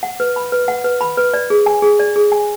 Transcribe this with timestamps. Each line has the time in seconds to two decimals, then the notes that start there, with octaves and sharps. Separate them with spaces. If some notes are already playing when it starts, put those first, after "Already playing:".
0.03 F#5
0.20 B4
0.36 B5
0.52 B4
0.68 F#5
0.84 B4
1.01 B5
1.17 B4
1.34 D5
1.50 G#4
1.66 G#5
1.82 G#4
1.99 D5
2.16 G#4
2.32 G#5